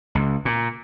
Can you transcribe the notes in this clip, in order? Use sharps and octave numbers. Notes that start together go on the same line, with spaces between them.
C#2
A#2